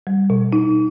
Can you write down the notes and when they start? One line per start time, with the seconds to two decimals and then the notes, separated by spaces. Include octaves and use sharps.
0.07 G3
0.30 B2
0.53 D#4